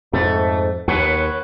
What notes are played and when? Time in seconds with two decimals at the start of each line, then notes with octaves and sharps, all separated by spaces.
0.13 F2 G#2 A3
0.88 D#2 B4 C#5 F#5